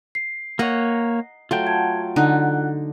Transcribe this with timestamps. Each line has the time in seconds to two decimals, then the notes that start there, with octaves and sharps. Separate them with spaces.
0.15 C7
0.59 A#3 C#5 D#5 F#5 A#5
1.51 F#3 A3 F4 G5
1.67 F#5 A5 G#6
2.16 D3 D#4 F#5 F#6